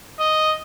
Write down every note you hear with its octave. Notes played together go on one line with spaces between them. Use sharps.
D#5